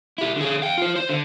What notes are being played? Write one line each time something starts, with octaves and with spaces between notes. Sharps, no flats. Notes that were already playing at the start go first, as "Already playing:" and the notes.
E4 G4
D3 G#4
F5 G5
F4 C5
C5
D3